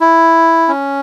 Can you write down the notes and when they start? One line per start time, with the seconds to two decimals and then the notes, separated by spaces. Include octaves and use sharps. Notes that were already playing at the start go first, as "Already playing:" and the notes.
0.01 E4
0.68 C#4